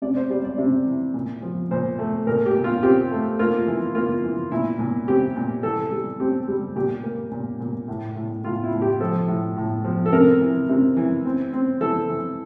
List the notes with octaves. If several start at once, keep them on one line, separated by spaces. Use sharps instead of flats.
C3 D5
C5
G3 D5
D5
C3
E3
A#2
F3
A#2 C5
A3
A#2 A#4
G4
A#2
F4
C4 G4
A3
A#3 F4
E3
A#3 F4
E3
A#2 E4
A#2
C4 G4
A#2
E3 A4
G3
C4 G4
G3
A#2 G4
A#3
A#2
A#2
A2
A2
A2 F4
E4
A2
G4
F3 A4
A2
A2
F3
A4
C3 A#4
E3
C3
E3
C4
C4
E3 A4
E3